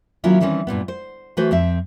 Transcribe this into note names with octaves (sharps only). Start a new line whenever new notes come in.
D#3 F#3 A#3 C#4 E4 F4
D#3 E3 G3 C4 C#4
G2 A#2 G3 B3
C5
E3 A3 F#4 B4 C5
F2 C4 E5